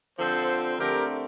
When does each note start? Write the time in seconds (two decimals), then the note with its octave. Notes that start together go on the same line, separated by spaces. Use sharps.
0.18 D3 F3 C4 A4 C5
0.77 D3 A3 C4 G4 A#4